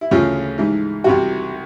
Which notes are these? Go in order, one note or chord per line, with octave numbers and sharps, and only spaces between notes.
E4
D2 C#3 E3 F4
G#2 E3
C2 C3 E3 F#4